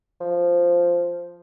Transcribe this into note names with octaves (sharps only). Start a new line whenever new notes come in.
F3